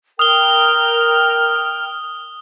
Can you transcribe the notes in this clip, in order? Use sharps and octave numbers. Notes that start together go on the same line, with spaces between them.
A#4 G5 D#6 F6 G7